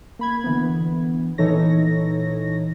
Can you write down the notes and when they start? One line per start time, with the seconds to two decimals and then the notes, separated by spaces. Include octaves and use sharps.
0.19 A#3 B5 G#6
0.44 D3 E3 B3
1.38 A#2 E3 D#4 A4 C#5 A#6